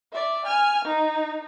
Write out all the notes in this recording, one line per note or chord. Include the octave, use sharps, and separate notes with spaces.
D5 E5
G#5 F6
D#4